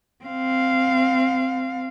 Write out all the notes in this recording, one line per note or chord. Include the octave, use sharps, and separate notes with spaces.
C4 F5